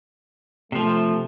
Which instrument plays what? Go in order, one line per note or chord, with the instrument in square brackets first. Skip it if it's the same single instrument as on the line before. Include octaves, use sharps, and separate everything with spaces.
[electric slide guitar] C3 F3 [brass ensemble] A3